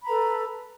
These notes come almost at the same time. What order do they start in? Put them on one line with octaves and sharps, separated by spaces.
B5 A#5 B4 A4